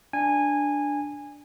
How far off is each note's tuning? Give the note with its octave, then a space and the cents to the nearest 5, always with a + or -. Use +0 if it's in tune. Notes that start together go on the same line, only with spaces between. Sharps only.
D4 +0 G#5 -15